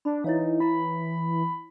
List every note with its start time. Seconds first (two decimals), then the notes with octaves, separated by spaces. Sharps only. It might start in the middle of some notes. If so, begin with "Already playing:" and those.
0.05 D4 B5
0.24 E3 D#4 E4 C#5 F5
0.60 E4 A#5 B5